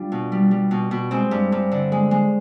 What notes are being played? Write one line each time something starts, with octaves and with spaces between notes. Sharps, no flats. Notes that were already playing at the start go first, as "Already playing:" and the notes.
Already playing: G3 D4 F4
B2
G3
G3
B2
B2
G#3 C4
G2
G2
D3
G#3
G#3